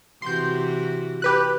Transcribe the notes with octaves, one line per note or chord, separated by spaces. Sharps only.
C3 E3 F#4 C6 G6
G4 B4 F#6